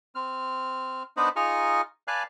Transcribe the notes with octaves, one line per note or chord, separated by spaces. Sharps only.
C4 F6
B3 D4 D#4 B4 C5 D#5
D#4 F4 G#4 A#5 C#6 F6
B4 D5 F5 G#5 A5 F#6